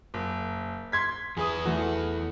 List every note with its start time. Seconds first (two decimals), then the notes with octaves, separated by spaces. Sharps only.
0.14 F#1
0.92 C6 G#6 B6
1.37 E2 G#4 B4 D#6
1.65 E3 A3 F#4